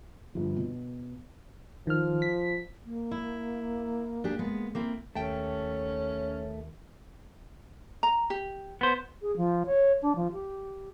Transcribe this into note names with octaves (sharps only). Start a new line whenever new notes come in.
G1 F3
B2
D#3 F3 F6
B6
A#3
E4
D4 G4 G#4
G#3 B3
A#3 C4 E4
D#2 A3 C#4 G5 A5
A#5
G4
B3 C5
G#4
F3
C#5
D4
F3
G4